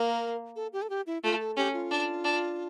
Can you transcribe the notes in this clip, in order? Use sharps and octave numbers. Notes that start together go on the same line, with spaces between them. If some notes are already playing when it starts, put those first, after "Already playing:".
Already playing: A#3 A#4
A4
G4
A4
G4
E4
A3 F4
A4
C#4 G4
F4
D4
D4